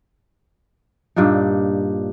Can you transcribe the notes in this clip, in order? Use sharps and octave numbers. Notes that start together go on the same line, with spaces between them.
G2 A#2 D4 D#4